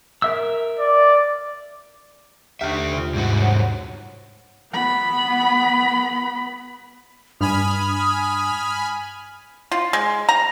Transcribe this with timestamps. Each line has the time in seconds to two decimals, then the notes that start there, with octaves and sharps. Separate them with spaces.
0.22 A#4 E5 E6
0.79 D5
2.61 D#2 D3 G4 E5 F6
2.93 C3 F4
3.15 G#2 G3 F#4
3.40 C5 C#5 F#5
4.72 B3 B5
7.41 G2 G#5 B5 D#6 F6
9.72 F4
9.93 G#3
10.29 A#5